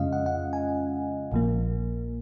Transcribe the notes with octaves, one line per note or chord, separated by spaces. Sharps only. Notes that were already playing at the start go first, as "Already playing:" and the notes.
Already playing: F2 C#3 G#3 C#4 F4 D#5 F5
F#5
F#5
G#5
A#1 A#2 F3 A#3